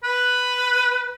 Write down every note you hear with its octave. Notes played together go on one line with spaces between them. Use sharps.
B4